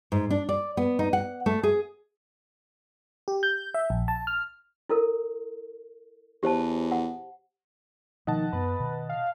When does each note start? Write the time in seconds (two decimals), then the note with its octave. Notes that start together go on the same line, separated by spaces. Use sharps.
0.12 G#2
0.31 D4
0.49 D5
0.77 B3
0.99 D#4
1.13 F#5
1.46 A3
1.63 G#4
3.28 G4
3.43 G6
3.74 E5
3.90 A#1
4.08 A5
4.27 F6
4.89 E4 A4 A#4
6.43 E2 G4 C5 A5
6.92 F#5
8.27 B2 D#3 F3 A#3 D#5 F#5 A5
8.53 F#2 B3 B4
8.80 B2 D#3
9.09 F5